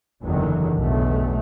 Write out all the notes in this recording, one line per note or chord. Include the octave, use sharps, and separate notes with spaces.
F#1 E2 D3 D#3 F#3
B1 E2 G2 A3